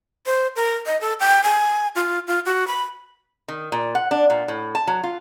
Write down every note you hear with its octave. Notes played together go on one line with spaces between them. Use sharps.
C5
A#4
D#5
A4
G5
G#5
F4
F4
F#4
B5
D#3
A#2
F#5
D4
A#2
A2
A5
F#3
F4